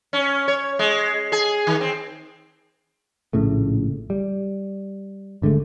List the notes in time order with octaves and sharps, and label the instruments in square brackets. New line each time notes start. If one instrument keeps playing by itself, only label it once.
[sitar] C#4
C#5
G#3
G#4
D#3
C4
[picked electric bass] A#1 A2 C#3 A3
G3
G#1 D3 G#3 A3